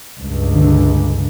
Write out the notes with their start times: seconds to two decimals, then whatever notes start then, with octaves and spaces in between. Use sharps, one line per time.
0.21 C#2 G2
0.55 D3